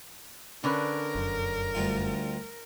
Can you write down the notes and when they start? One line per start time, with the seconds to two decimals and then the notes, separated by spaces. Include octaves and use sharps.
0.64 D3 C#4 A#4 B4
1.15 F1 F#2
1.75 D2 G3 F4